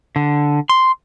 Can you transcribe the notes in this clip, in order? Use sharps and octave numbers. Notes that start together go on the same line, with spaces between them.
D3
C6